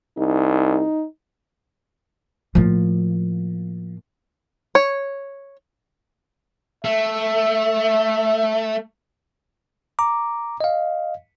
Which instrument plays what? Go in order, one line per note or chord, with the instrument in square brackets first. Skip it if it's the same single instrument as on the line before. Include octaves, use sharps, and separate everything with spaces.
[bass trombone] C2 [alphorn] D#4
[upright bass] A2 A#3 [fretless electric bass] F3
[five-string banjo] C#5
[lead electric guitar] A3 [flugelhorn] E5
[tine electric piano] A#5 D6
D#5 F5